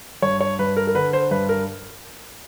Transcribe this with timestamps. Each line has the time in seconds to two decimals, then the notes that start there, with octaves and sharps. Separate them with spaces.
0.22 G2 C#5
0.41 C#5
0.59 G2 B4
0.77 A#4
0.87 A#4
0.95 D3 B4
1.13 C5
1.31 G2 B4
1.49 A#4